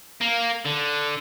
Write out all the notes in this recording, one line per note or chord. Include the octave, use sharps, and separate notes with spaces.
A#3
D3